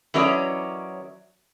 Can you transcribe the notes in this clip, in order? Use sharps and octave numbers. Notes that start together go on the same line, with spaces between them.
E3 F#3 C#4 A#4 D5 D#5